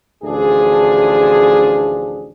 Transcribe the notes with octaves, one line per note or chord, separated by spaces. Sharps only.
A1 D2 F3 D4 G#4